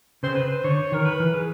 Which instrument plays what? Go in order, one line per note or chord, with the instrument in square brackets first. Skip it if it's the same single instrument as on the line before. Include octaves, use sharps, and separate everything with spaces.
[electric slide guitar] C#3 [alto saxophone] C5
[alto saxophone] B4
C5
[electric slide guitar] D3 [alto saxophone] C#5
[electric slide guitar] D#3 [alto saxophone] A#4
[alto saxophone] B4
[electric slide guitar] E3
[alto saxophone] G#4